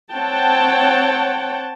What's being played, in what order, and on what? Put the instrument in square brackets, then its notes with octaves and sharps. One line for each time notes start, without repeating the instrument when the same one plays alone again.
[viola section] C4 C#5 F#5 G5 A5